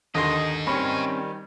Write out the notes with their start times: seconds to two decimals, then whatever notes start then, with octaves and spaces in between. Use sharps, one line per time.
0.15 D#2 D3 D#4 G#4 D#5 C6
0.67 D#3 G3 C4 C#4 C#5 B5